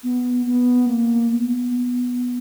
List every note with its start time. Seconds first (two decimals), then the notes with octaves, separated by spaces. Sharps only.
0.03 B3
0.46 B3
0.88 A#3
1.30 B3